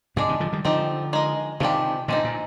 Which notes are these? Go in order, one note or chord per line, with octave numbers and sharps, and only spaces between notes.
G#2 C3 G#3 D4 G#4
C3 D#3
D3 F3
D#3 G3
D3 F3 C4 D#4 G4
G#3 D#4 A#4 D#5
C3 D#3 F3 G#3 D4 G4
A#2 D3 G#3 C4 D#4
A#2